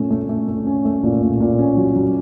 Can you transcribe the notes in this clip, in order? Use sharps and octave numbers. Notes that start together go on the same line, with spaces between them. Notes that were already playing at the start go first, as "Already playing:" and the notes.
Already playing: A#2 A3 C#4
A3
A3
A3
C#4
A3
A#2
A#2
A#2
C#4
F#3
F#3